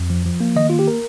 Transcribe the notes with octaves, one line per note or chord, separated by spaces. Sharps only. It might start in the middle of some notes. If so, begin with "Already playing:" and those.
Already playing: F2
F3
F3
A#3
D#3 D#5
A#3 F4
G4
A#4